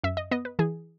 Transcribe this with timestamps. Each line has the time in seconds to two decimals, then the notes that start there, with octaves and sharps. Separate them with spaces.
0.04 F#2 E5
0.17 D#5
0.31 B3 D#5
0.45 B4
0.59 E3 G#4